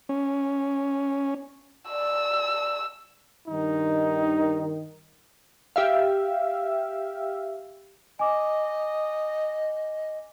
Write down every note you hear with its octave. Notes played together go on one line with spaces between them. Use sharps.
C#4
D5 E6
G2 D#3 D#4
G4 E5 F5
D#5 G#5 D6